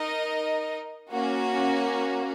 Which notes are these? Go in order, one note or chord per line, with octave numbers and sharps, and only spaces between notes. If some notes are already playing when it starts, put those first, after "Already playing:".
Already playing: D#4 A#4 D#5
A#3 C#4 F#4